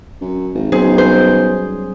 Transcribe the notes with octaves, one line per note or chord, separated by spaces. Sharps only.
F#2
G#1
B1 F#3 C#4 G#4 C5
G3 G#4 C5